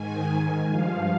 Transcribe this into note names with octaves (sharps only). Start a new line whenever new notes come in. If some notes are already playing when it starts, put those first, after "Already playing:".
Already playing: G#2 D#3 G#5
G2 F3 F5